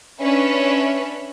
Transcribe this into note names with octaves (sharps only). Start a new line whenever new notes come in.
C#4 D4 B4 E5